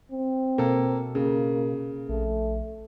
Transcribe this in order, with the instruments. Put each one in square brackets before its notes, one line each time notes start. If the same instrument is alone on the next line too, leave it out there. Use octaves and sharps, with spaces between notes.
[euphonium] C4
[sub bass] B2 [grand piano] A#3 A4
[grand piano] C#3 [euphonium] A#3
[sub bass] A#1 [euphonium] A3